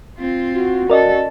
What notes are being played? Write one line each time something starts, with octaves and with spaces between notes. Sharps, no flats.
C4 F4
F#4
C#4 A4 A#4 D5 D#5